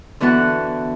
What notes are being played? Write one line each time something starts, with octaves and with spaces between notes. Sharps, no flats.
D3 E3 B3 F#4 F#5 A5